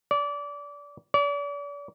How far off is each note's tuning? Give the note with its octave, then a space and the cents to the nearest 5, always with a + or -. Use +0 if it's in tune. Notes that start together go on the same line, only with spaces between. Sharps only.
D5 -25
D5 -40